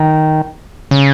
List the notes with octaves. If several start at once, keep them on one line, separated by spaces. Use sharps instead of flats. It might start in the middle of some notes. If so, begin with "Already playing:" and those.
Already playing: D#3
C#3